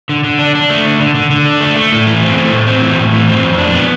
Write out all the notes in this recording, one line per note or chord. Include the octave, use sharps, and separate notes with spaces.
D3
D3
D4
D4
A3
D3
D3
D3
D3
D4
A3
A3
A2
E3
C4
A3
A2
C4
E3
A2
E3
C4
F2
D4
B3